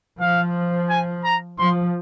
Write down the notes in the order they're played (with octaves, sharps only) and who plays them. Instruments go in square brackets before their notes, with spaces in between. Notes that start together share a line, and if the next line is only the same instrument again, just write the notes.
[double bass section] F3 [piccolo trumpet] F5
[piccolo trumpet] G#5
A#5
[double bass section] F3 [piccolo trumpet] C6